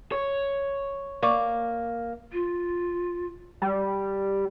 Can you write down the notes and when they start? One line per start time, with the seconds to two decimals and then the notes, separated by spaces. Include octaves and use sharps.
0.12 C#5
1.23 A#3 D5 C#6 D6
2.33 F4
3.62 G3